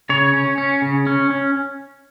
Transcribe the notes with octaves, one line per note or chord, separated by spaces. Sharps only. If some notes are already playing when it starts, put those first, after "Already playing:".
C#3 C#5
C#4
C#4
C#3
C#4
C#4